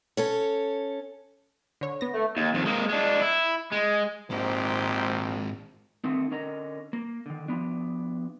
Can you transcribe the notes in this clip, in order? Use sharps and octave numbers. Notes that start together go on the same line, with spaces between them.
C#4 A4 C#5
D3 C#5
B3 A#6
A3
D#2
F2 D#3
G#3 A#3
G#3 D4
E4
G#3
A#1 G#2 C4 D#4 G4 C5
D#3 A3 A#3 C4 D#4
D3 C#4 A#4 D#5 A#5
A#3
D3 D#3
F3 B3 D4